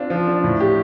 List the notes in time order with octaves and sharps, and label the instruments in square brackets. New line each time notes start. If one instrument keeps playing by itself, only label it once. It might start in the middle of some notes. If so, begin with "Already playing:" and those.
Already playing: [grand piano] C4 D4 F4
F3
D4
A2
G4